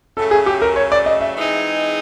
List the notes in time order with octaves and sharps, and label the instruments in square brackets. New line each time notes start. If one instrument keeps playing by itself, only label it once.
[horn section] C#3 F#3 A3 [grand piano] A4
[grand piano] G#4
G4
A#4
C#5
D5
D#5
E5
[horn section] E3 G#3 C4 D#4 G#4